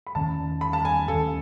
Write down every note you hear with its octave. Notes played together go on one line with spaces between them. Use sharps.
B5
E2 D#3 A3 C#4 A5
B5
A5
G#5
D#2 D#3 A3 C#4 A4